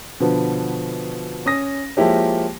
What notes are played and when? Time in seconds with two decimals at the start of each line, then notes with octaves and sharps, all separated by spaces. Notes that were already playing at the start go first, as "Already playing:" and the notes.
0.20 B2 D3 F3 B3
1.46 C#4 D#6 A#6
1.97 F3 G#3 A#3 E4 G4 C#5